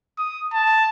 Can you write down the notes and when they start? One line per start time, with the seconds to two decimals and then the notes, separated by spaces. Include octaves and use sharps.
0.18 D#6
0.53 A5